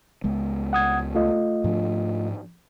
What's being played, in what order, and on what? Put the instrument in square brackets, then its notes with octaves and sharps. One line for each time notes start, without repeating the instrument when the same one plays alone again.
[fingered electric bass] C#2 G#3 B3
[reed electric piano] F#5 D#6 G#6
A3 F4 D#5
[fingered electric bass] G#2 F3 D4